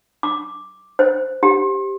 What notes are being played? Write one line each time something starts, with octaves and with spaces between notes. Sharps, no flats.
D6
C5
G4